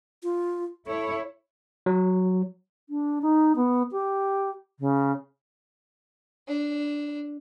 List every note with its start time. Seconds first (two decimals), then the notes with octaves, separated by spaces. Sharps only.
0.23 F4
0.87 E4 A4 C#5
1.86 F#3
2.89 D4
3.22 D#4
3.56 B3
3.92 G4
4.80 C#3
6.48 D4